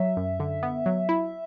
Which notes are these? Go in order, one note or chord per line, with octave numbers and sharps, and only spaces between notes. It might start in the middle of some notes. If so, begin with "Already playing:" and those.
Already playing: F#3 E5
F#2
D3
B3
F#3
E4